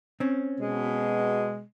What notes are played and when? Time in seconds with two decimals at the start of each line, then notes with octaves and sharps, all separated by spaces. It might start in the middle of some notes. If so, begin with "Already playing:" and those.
0.20 C4 C#4
0.60 B2 G#3